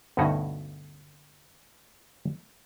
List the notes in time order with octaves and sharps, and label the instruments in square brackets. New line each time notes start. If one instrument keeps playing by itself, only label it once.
[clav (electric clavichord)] D2 G2 B2 C#4 D#4 F#4